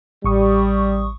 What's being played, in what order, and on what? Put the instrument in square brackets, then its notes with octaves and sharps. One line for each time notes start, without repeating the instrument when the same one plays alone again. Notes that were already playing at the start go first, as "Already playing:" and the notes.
[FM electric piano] A1 C#6 D#6 [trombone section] G3